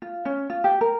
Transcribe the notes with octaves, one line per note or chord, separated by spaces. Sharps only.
F4
C#4
F4
G4
A#4